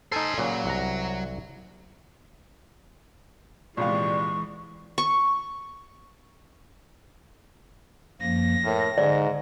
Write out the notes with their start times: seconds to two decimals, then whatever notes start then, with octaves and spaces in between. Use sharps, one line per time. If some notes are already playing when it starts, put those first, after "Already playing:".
0.12 D#4 A4 C5 G#5
0.38 A#2 C#3 F#3
0.66 C2 F#5 A#5
3.77 A#1 C3 E3 G#3 D5 F5 C#6
4.98 C#6
8.21 F#2 F3 A#3 A#6
8.65 A2 A#4
8.98 G#2 D3 D#4 D5